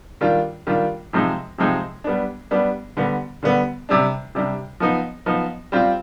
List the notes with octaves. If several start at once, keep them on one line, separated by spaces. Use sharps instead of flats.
D#3 G3 D4 F4
D#3 G3 D4 F4
C3 F3 G#3 C4 D#4
C3 F3 G#3 C4 D#4
G3 B3 D4
G3 B3 D4
D3 G3 B3
D3 G3 B3
C3 G3 D4
C3 G3 D4
F3 B3 D#4
F3 B3 D#4
G3 C4 F4